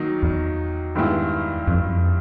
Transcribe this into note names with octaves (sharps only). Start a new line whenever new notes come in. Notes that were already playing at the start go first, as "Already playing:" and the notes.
Already playing: D#3 F#3 A#3 D#4
E2
G2 D#3 G#3 B3 E4
F2
F#2
F2